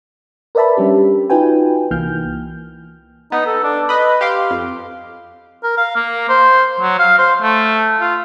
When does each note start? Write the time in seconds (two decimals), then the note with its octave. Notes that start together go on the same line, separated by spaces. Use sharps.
0.55 A#4 B4 D5 E5 A5 B5
0.77 G3 C#4 D4 G4
1.30 D#4 F4 F#4 B4 G5 G#5
1.91 C2 E3 A#3 F6 G6
3.32 B3 D#4
3.46 A4
3.64 D4
3.89 B4 D#5 B5
4.21 G4 F5 C6 D6
4.50 F2
5.64 A#4
5.77 F5
5.96 A#3
6.29 C5
6.80 F#3
6.99 F5
7.18 C5
7.42 A3
8.00 F4